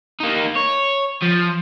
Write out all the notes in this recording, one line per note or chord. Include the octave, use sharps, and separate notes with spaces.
A#3 D#4
C#5
F3